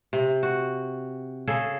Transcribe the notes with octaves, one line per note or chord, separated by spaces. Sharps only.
C3
F#4
C#3 G#4 A4